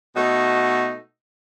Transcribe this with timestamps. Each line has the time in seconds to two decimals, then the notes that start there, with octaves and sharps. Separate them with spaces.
0.15 B2 A3 D#4 F#4